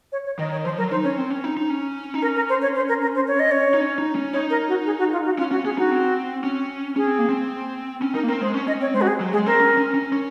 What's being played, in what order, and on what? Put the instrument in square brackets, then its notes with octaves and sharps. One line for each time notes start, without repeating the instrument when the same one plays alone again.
[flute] C#5
C#5
[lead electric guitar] D#3 [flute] D#5
[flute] C#5
[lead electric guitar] F3 [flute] C5
[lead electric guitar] F#3 [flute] A#4
[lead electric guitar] D#4 [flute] C5
[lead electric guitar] C#4 [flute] C#5
[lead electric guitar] C4
C#4
D#4
D#4
C#4
D#4
[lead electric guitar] C#4 [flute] A#4
[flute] A#4
C5
C#5
C5
A#4
A#4
C5
C#5
D#5
C#5
[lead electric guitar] D#4
C#4
D#4
C#4
[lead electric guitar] D#4 [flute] C#5
[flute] A#4
F#4
G#4
F#4
F4
F#4
[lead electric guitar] C#4 [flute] F4
[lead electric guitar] C#4 [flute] F#4
[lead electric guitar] C#4 [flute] G#4
[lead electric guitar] D#4 [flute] F#4
[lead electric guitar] C4
C#4
[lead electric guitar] C#4 [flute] G#4
[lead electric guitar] C4
A#3
C4
C#4
[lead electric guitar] D#4 [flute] A#4
[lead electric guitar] A#3
[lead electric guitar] C4 [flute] A#4
[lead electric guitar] G#3 [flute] C5
[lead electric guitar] C#4
[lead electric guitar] C#4 [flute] D#5
[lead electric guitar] C4 [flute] C#5
[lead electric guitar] G#3 [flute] C5
[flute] F#4
G#4
[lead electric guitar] F#3
[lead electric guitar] G#3 [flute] G#4
[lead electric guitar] C4 [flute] A#4
[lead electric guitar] C#4
C#4
C#4
C#4